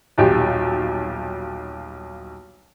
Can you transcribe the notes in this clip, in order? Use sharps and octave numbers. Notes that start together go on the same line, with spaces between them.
D#1 B1 G4